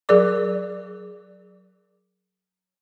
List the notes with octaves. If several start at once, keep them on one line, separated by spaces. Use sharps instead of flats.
F#3 G#4 A#4 D5 D6